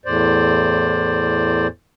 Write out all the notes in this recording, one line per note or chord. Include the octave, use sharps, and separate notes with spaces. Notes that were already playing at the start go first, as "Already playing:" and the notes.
E2 A2 C5 D5